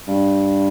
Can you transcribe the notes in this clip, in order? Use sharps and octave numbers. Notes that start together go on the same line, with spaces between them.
G2